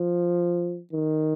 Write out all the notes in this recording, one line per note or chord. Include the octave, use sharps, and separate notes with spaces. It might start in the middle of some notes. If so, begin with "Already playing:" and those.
Already playing: F3
D#3